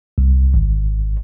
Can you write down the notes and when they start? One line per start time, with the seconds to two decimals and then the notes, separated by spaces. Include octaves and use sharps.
0.18 C2
0.54 G#1